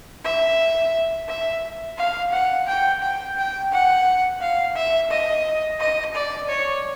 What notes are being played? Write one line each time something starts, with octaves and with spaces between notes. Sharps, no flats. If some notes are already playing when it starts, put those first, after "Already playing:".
E5
E5
F5
F#5
G5
G5
G5
F#5
F5
E5
D#5
D#5
D5
C#5